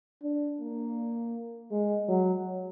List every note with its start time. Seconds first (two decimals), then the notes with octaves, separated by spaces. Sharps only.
0.23 D4
0.61 A#3
1.71 G#3
2.09 F#3